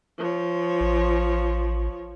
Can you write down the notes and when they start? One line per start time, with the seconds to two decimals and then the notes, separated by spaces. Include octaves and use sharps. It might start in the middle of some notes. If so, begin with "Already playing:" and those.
0.18 F3 C#5
0.81 A1